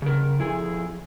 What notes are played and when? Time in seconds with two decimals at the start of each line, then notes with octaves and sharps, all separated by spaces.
0.02 C#3 A#4
0.39 F2 E4 G#4 G#5